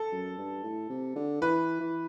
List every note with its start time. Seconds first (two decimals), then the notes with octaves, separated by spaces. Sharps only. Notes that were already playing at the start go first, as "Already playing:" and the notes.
Already playing: A4
0.12 F#2
0.38 G2
0.64 A2
0.90 C3
1.16 D3
1.41 E3 B4
1.80 E3